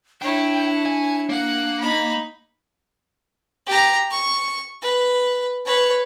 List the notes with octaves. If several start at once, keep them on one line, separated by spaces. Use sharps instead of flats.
D4 E4 C#5 G5
G#5
A#3 F#5
D#4 B5
G4 A#5
C#6
B4
B4 C#5